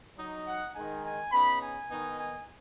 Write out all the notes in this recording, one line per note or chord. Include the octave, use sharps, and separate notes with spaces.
F#3 D#4
F#5
D#3 G#3 D#4 G#5
G#5
C#3 B3 D#4 B5
G#5
D#3 B3 D#4
G#5